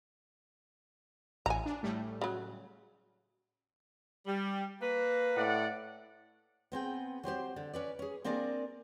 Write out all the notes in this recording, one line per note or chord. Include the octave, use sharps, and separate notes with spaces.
A1 A2 G#5 A#5
D4
A2 G3 A3
C#3 F#3
G3
A#3 B4
A2 D5 F#5
B3 C4 G#4 G5
F#3 C4 G4 C5
D3
C#4 B4 D5
C#4 G#4
A#3 C4 D4 G#4 A#4 D5